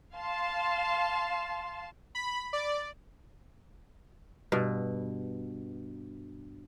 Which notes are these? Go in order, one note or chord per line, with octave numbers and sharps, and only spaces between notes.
F5 A5 C6
B5
D5
G2 B2